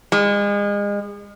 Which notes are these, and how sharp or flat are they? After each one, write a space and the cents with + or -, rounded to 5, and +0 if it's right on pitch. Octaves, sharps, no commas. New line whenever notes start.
G#3 -35